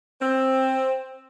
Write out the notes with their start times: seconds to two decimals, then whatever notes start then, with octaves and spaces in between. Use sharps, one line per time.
0.21 C4